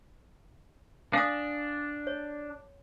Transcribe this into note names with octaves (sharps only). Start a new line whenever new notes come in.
D4 F5 G#5 D#6
C#5